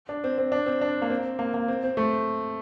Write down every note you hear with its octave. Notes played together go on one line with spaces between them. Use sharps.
D4
C4
C4
D4
C4
D4
A#3
C4
A#3
A#3
C4
C4
A3